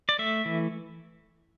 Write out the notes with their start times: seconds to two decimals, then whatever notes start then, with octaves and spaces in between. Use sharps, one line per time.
0.09 D5
0.19 A3 E5
0.45 E3